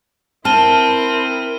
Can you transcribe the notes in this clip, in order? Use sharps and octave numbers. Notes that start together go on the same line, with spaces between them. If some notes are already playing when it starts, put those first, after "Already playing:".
C4 E4 A#4 A5 F6 D#7 G7